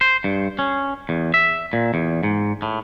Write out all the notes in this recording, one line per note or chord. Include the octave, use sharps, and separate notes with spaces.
C5
G2
C#4
E2
E5
A#2
E2
G#2
A2